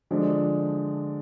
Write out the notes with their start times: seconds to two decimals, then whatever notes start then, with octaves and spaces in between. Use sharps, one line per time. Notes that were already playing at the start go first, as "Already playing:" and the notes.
0.11 D3 F3 G#3 D4